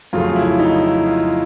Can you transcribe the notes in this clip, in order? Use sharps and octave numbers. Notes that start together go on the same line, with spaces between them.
F2 C#3 F#3 A3 F4
E4
D#4
E4
F4